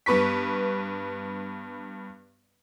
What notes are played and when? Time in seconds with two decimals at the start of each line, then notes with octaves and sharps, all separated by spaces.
0.06 G2 B3 B4 C#6 B6